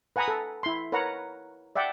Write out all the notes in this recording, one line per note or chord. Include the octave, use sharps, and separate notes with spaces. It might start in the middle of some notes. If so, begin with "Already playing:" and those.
B4 F#5 G#5 A#5 B5 D#6
A4
E4 C6
A#4 B4 C#5 F#5 A#5
D5 E5 F#5 G5